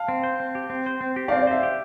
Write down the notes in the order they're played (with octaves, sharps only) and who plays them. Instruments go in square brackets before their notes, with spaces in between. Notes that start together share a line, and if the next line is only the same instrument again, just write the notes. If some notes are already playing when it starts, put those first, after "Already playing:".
Already playing: [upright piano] F5 A5
[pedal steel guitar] C4
C5
C4
G4
C4
C5
C4
G4
[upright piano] D5 F5
[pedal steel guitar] C4
[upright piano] D5
[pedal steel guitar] C5 [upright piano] E5
[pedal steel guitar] G4